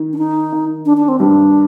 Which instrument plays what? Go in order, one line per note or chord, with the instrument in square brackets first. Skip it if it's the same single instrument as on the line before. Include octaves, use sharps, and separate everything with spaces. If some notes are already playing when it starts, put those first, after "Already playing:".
Already playing: [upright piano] D#3
[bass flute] D4
D#4
[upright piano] D#3
[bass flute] D4
D4
C4
[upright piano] G2 [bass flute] D4